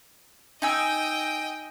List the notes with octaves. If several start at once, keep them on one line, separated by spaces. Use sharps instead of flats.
D#4 D#5 G5 G#5 E6